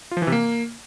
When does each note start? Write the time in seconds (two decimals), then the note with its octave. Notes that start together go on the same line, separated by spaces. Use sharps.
0.11 F4
0.17 F3
0.22 E3
0.27 C3
0.32 A#3